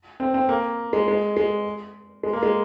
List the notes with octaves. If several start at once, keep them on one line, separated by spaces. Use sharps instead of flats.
C4
C4
A#3
G#3
G#3
G#3
G#3
A#3
G#3